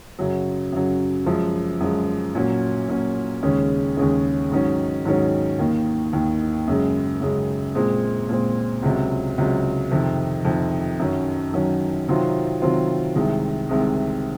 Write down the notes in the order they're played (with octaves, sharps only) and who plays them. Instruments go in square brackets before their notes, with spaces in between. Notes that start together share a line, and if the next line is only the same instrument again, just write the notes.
[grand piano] F#2 C#3 F#3
F#2 C#3 F#3
F#2 F3 G#3
F#2 F3 G#3
A#2 F#3 C#4
A#2 F#3 C#4
D#2 C#3 G#3 C#4
D#2 C#3 G#3 C#4
G#2 D#3 F#3 C#4
G#2 D#3 F#3 C#4
D#2 D#3 A#3
D#2 D#3 A#3
F#2 C#3 G#3
F#2 C#3 G#3
A#2 G#3 C4
A#2 G#3 C4
C#2 C3 F#3
C#2 C3 F#3
F2 C3 D#3
F2 C3 D#3
F#2 D#3 F#3 C#4
F#2 D#3 F#3 C#4
C3 D#3 F#3 C4 F4
C3 D#3 F#3 C4 F4
C2 C3 D#3 G#3
C2 C3 D#3 G#3